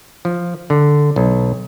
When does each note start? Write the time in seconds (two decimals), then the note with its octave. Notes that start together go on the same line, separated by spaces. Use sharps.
0.25 F3
0.70 D3
1.16 B1